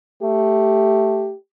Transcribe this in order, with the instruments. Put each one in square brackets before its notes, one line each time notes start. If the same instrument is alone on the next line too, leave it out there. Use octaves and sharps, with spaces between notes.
[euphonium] A3 [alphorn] G4